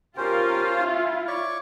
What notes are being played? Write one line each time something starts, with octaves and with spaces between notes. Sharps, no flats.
C#4 F4 G4 A#4 C5
E4
C#5 D5 C#6